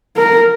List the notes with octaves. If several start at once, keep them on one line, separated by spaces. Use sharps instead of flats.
A#4